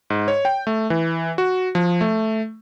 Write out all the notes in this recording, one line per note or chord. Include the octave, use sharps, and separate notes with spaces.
G#2
C#5
G5
A3
E3
F#4
F3
A3